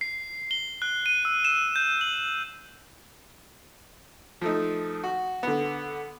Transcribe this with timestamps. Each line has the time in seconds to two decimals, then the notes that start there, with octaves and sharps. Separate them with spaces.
0.01 C7
0.51 G7
0.82 F#6
1.06 D#7
1.25 E6
1.45 E7
1.76 G6
2.01 F#7
4.41 F3 A3 D#4
5.04 F#4
5.43 D3 B3